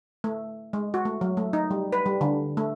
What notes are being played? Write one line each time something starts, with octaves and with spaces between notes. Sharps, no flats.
A3
G#3
F#4
A3
F#3
A3
D#4
G3
B4
G3
D3
A3